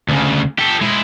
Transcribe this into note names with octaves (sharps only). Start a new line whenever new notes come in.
D2 C#3
G4 A4
G#3 E4